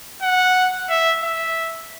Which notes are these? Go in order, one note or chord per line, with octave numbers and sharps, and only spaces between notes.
F#5
E5
E5